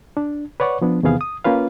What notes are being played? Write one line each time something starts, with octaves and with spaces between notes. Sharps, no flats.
D4
B4 C#5 D5 F#5 C#6
F3 B3 D4
E2 C3 D#3 B3 G#4 F5
D#6
A#3 C#4 F4 B4 F5